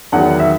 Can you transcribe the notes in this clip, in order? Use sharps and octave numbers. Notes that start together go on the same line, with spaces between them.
E2 D#3 F#3 F#5
E5